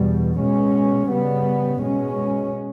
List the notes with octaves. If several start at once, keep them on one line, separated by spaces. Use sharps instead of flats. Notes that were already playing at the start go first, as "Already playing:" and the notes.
Already playing: E2 B2 G3
B2 G#3 C#4
C#3 G3 B3
B2 G#3 C#4